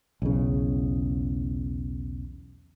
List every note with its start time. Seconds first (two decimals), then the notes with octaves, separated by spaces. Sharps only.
0.22 B1 E2 C#3